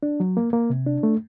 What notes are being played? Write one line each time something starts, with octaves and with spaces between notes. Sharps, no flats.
D4
F#3
A#3
A#3
C3
D4
A3